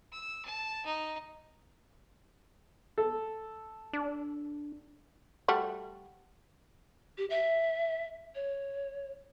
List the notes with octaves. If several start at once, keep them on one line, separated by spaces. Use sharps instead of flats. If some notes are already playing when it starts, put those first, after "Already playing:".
E6
A5
D#4
A4
D4
G3 A3 F#4
G4
E5
C#5